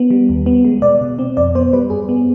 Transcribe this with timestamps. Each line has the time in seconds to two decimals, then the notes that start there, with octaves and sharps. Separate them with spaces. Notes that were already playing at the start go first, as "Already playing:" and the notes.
Already playing: B3
0.11 G3
0.29 D#2
0.46 B3
0.65 G#3
0.82 B2 D5
1.01 B2
1.19 C4
1.37 F2 D5
1.55 B3 C5
1.73 G3 B4
1.90 G2 G#4
2.09 B3